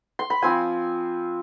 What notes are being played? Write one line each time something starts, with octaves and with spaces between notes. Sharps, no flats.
C6
B5
F3 C4 F4 G#5